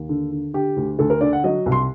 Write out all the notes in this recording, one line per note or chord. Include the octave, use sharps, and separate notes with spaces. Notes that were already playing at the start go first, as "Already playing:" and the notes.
Already playing: D#2
D3
D3
D3 G4
D2
D2 A4
A#4
D3 D5
F#5
F#3 D#5
C2
C6